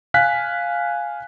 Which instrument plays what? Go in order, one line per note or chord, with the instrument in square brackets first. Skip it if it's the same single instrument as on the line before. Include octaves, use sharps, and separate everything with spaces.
[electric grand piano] F5 G#5 F#6 B6